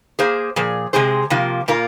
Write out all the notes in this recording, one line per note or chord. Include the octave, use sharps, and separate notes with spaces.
A#3 G#4 C5
A#2 F3 G#4
C3 G#3 C4 G#4 C5
C3 F3 A#3 F4
A#2 A#3 F4 A#4